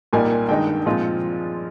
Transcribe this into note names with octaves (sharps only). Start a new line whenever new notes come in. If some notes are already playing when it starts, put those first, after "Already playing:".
C2 A#2 G3 A#3 D#4 G#5
G2 D#3 G#3 D#4 G5
A#2 F3 G#3 C4 F4